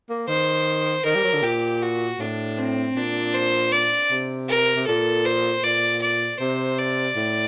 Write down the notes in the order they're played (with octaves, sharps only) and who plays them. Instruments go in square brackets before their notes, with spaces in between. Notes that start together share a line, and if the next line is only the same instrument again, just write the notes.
[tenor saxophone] A#3
[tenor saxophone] D#3 [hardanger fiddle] C5
[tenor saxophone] D#3 [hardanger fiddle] A#4
[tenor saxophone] G3
F#3
D3
[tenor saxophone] A#2 [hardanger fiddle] G4
[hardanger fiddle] F#4
[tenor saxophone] A2 [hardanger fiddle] D4
[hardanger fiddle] C4
[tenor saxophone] A#2 [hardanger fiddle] D4
[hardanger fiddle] C5
D5
[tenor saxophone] C3
[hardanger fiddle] A#4
[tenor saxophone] C3
[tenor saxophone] A#2 [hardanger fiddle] A4
[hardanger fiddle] C5
[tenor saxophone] A#2 [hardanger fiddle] D5
[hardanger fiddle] D5
[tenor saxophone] C3 [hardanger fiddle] C5
[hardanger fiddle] D5
[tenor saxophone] A2